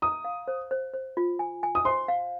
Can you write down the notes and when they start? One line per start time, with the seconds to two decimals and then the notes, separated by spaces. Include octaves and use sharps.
0.02 A#5 D#6
0.25 F5
0.48 C5
0.71 C5
0.93 C5
1.17 F4
1.39 G#5
1.63 G#5
1.75 D#6
1.85 C5 C6
2.08 F5